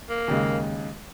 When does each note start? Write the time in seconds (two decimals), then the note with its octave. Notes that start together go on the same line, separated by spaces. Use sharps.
0.10 A#3
0.28 D#2 C#3 G#3